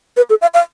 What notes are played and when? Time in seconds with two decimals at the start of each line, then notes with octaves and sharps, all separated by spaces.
0.17 B4
0.30 A4
0.42 F5
0.54 F5